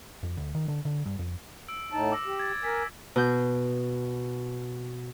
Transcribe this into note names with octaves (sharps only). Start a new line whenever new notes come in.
F2
D2
D#3
D3
D3
G2
F2
E6 D7
A2 D#4 A5
D6 E6 A#6
G4
G#6 A6
A#4 G#5 A#6 B6
B2 G6